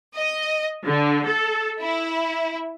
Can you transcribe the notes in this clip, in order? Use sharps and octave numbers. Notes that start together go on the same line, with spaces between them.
D#5
D3
A4
E4